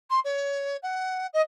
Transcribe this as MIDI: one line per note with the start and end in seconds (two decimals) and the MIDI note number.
0.10 0.19 84
0.24 0.77 73
0.82 1.26 78
1.33 1.40 75